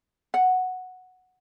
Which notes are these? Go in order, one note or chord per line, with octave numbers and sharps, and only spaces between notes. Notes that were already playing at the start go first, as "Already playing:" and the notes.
F#5